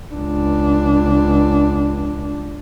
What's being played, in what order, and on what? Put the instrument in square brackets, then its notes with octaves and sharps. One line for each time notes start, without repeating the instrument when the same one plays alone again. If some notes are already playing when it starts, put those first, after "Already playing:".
[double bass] C#2 D4